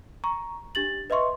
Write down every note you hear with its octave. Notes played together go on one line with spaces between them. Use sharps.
A#5 C#6
D4 G4 A6 F#7
B4 D#5 E5 C6 C#6